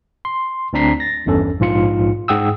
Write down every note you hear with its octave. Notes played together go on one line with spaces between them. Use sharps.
C6
D2 C4 D4 A#5 B6 C7
A6 A#6
G#1 E2 G2 C#4 A4
A#1 G#2 F4 C#7
G#2 G#4 F#5 G5 D#6 E6